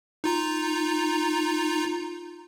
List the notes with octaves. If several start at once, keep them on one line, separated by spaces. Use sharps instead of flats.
D#4 F4 A#5